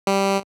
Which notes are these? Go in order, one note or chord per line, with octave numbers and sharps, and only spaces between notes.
G3